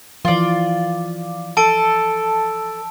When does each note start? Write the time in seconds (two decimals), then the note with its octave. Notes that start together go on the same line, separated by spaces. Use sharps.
0.25 E3 F3 F4 D5
1.57 A4 A5 D7